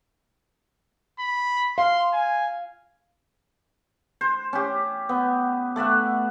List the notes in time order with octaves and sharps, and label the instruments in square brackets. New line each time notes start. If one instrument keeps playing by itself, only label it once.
[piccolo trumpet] B5
[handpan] F5 [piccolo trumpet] C6
[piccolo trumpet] G#5
[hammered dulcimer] C5
C#4 G4
B3
A3 D5 E5 F#5